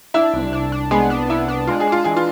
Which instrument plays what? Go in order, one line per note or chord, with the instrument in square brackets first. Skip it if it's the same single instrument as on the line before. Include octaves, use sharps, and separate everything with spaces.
[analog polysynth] D4 [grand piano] E4 E5
[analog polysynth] C2
D4
D4
[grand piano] G#3 G#4 [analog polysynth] B3
[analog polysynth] D4
[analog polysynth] B3 [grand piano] E4
[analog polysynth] D4
[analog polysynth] G#3 [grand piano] F4
[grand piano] G#4
[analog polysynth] D4 [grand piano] F4
[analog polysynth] E3 [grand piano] G#4
[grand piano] F4